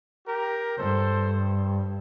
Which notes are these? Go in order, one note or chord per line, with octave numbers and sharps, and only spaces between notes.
G4 A#4
G2 A4 C5